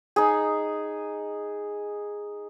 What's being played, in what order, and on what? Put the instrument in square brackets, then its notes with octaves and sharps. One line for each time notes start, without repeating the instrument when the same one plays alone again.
[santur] D#4 G#4